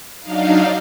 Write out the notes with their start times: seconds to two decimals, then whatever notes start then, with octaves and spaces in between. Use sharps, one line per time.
0.21 F#3 D4 D#4 F5